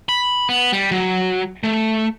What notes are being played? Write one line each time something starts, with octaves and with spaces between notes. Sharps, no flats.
B5
B3
G3
F#3
A3